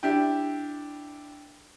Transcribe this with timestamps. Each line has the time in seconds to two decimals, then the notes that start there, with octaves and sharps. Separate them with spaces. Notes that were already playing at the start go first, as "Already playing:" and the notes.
0.03 D4 E4 G4 G5